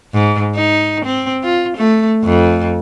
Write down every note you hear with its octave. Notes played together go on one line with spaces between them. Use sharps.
G#2
D#4
C4
F4
A3
F2